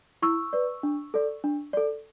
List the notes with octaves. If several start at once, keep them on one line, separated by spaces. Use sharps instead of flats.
E4 C#6 E6
B4 D5
D4
A4 D5
D4
A4 D5